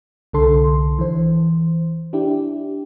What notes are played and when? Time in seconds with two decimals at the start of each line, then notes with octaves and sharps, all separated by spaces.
0.33 C2 D3 A4 C6
0.99 E3 C5
2.13 D4 E4 G4